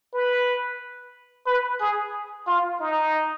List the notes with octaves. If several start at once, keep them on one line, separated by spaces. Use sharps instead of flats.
B4
B4
G#4
F4
D#4